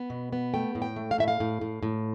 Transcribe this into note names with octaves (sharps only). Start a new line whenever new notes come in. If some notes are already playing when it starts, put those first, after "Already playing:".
Already playing: B3
B2
B3
A3 G5
A2
G5
A3
F5
A2 E5
F5
A2
A2
A2